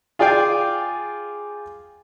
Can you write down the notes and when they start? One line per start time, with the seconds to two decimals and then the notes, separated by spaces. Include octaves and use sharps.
0.19 F4 G#4 D5 F5 G5 G#5